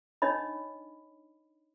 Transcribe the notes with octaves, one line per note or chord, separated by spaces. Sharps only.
D4 D#4 C#5 D#5 B5